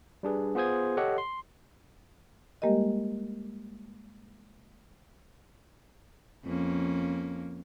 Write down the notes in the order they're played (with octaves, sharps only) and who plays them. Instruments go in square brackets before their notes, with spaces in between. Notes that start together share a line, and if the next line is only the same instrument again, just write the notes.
[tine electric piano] G3 D4 G#4 B4
B3 F4 G#4 C5 D#6 G#6
G4 A4 C#5 D#5 F#5
C6
[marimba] G3 G#3 A#3 G4 A#4 D#5
[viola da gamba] F2 A#3 C#4